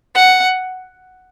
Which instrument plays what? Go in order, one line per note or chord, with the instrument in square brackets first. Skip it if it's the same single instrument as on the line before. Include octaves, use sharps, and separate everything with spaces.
[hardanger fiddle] F#5